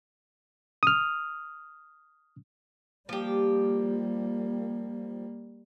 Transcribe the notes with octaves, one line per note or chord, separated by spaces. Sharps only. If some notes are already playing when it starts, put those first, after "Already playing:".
D#6 F6
F3 G3 A#3 G4